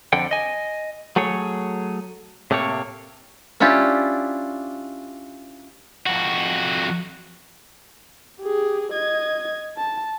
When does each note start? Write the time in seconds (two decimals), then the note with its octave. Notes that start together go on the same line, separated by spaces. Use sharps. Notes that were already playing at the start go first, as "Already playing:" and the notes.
0.13 F2 D3 F#5 G5
0.31 D#5 G#5
1.16 F#3 A3 G#4 C#5
2.51 A2 C3 A3 A#3 C#5
3.60 C#4 D4 E4 F4 G4
6.06 F2 F#4
8.40 G4 G#4
8.92 D#5 G#6
9.77 A5